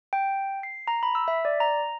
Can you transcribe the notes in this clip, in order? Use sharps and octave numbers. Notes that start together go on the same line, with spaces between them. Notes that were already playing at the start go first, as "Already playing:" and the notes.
G5
C7
A#5
B5
E6
E5
D5
A#5